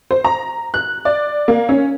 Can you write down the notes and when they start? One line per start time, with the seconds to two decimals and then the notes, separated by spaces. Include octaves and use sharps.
0.11 C5
0.24 A#5
0.74 F#6
1.05 D5
1.48 A#3
1.69 C#4